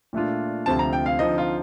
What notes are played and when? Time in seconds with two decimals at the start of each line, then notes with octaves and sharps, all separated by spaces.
0.13 A#2 A3 D4 F4
0.66 D2 C3 F3 C4 F4 A5
0.79 A#5
0.93 G5
1.06 F5
1.19 D3 F3 C4 D#4 D#5
1.38 F4